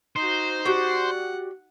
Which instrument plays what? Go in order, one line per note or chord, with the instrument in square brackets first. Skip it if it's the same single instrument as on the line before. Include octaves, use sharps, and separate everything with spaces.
[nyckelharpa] D#4 F#4 [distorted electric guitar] C5
[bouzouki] F#4 G4 D5 [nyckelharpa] F#5